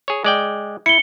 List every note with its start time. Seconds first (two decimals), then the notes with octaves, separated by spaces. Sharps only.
0.08 G#4 C#5
0.24 G#3 D5 G5
0.86 E4 C#7 G7